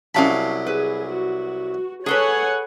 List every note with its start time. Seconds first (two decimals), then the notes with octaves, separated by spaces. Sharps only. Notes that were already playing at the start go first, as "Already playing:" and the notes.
0.15 C2 F#3 C#4 F5 A5 B5
0.67 G#4 B4
1.12 F#4
2.06 G#4 A4 B4 C#5 F#5 G#5